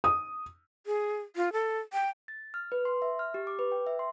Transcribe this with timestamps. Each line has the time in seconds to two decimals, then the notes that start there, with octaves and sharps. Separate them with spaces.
0.04 D#6
0.86 G#4
1.36 F4
1.53 A4
1.93 G5
2.28 A6
2.54 F6
2.72 B4
2.85 C6
3.02 E5
3.19 F6
3.34 G4
3.47 D6
3.59 B4
3.72 G5
3.87 E5
3.99 C6